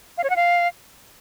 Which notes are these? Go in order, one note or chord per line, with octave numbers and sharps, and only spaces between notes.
F5
C#5
F#5
F5